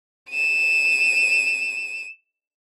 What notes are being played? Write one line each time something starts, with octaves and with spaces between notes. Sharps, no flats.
D#7 E7